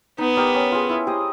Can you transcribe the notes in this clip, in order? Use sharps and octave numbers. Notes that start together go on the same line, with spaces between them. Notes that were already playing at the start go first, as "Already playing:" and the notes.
B3 D#4
G4 A#4 D5
C#4
F4 G#4
E4
G4 C5 D#5